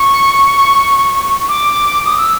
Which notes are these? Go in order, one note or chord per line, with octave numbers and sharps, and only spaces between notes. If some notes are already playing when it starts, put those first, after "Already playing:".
Already playing: C#6
D6
D#6
E6